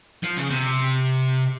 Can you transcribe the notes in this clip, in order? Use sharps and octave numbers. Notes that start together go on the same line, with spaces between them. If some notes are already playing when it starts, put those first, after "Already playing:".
F3
C#3
C3